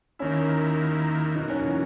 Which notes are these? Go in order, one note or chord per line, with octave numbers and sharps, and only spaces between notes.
D#2 D#3 A#3 C#4 E4
B2 F#3 A#3 D#4
C#4
E3